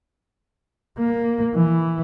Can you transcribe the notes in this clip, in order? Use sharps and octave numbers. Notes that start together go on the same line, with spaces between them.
A#3
E3